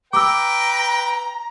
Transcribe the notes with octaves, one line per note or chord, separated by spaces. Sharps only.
B4 G5 A#5 D6 E6